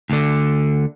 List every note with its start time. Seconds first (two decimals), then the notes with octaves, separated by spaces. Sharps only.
0.10 D2 D3